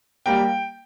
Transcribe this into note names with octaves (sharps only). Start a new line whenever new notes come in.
G3 A#3 G5